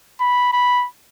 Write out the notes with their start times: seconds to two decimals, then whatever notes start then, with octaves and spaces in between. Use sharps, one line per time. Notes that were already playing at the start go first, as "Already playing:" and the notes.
0.20 B5
0.53 B5